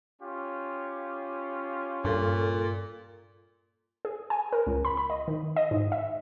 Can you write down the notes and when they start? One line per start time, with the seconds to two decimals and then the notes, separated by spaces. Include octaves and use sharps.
0.21 C#4 F4 G4
2.05 G2 A#2 A4
4.05 G#4
4.30 G#5
4.53 A#4
4.67 C#2
4.85 B5
4.97 B5
5.10 D#5
5.28 D#3
5.56 D#5
5.71 G#2
5.92 E5